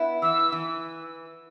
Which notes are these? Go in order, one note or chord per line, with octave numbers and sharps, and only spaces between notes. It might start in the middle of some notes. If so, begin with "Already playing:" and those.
Already playing: B3 E4
E3 E6
E3